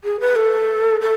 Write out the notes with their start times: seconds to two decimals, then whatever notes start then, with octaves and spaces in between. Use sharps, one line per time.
0.04 G#4
0.20 B4
0.36 A4
1.01 A4